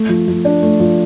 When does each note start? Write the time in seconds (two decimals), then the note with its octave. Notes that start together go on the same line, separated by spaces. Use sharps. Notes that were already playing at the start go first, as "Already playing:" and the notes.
Already playing: A3
0.09 F3
0.28 F3
0.45 D4
0.62 A3
0.80 F3